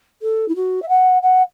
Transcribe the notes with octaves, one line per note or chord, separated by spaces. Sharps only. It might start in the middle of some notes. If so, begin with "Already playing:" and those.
A4
E4
F#4
E5
F#5
F#5